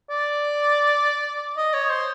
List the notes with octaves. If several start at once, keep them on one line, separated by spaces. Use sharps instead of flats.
D5
D#5
C#5
C5